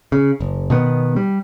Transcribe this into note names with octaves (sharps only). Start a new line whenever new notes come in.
C#3
F#1
B2 D#3 B3
G3